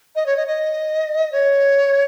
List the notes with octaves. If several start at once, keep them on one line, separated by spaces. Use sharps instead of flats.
D#5
C#5
D#5
D#5
C#5